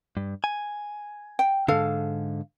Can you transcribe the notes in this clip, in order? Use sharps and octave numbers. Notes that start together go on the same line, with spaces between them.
G2
G#5
G5
G#2 D3 A4 F5